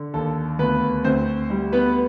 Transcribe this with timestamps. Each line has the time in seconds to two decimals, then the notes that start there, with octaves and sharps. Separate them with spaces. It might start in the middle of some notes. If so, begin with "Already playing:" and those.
Already playing: D3
0.14 D#2 A4
0.58 D2 B3 B4
1.04 D2 C4 C5
1.50 G3
1.72 B3 B4